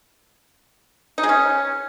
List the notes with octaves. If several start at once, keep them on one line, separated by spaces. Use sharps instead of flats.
D#4
G#3
C#4